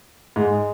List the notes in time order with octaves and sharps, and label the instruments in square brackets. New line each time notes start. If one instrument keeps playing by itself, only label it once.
[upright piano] G#2 [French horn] G#3